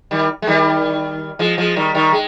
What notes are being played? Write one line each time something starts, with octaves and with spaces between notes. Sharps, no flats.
D#3 G3
G#3
D#3 G3
F3 G#3
F3 G#3
D#3 G3
D#3 G3
G#3